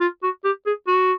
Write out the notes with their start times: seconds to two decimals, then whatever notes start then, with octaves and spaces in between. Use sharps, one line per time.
0.01 F4
0.23 F#4
0.44 G4
0.66 G#4
0.87 F#4